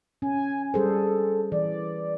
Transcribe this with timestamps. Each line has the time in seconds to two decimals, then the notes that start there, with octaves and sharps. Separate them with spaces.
0.22 C#4 G#5
0.74 G3 G#4 A4 C5
1.52 E3 D5